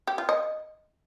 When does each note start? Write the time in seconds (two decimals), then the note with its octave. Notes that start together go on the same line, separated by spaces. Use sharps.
0.07 G4
0.18 F4
0.29 D#5